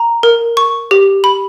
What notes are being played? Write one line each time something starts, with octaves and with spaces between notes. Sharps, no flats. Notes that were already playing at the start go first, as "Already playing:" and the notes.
Already playing: A#5
A#4
C#6
G4
B5